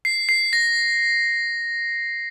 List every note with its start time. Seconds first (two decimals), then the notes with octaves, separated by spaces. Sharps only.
0.05 C7
0.29 C7
0.53 A#6